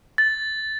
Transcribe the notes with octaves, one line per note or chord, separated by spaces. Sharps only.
A6